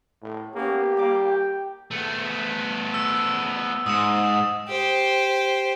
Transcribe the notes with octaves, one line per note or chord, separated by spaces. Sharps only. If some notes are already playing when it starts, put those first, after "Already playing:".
A2
A#3 B3 C#4 G4
G3 A#3 D6
G5
A3 B3
E6
G#2 D#6 E7
G4 C5